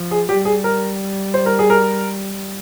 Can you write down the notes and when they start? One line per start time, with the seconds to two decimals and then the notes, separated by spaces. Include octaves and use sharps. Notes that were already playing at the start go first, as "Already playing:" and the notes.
Already playing: F3
0.11 G#4
0.29 G3 G4
0.45 G#4
0.64 A#4
1.34 C5
1.46 A#4
1.59 G#4
1.70 A#4